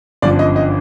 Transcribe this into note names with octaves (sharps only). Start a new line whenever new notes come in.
G1 F#2 D3 F3 D5
D#5
D#5